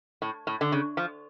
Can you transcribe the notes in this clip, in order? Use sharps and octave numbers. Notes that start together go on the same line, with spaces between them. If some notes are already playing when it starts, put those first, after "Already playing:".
A2
A2
D3
C#3
F3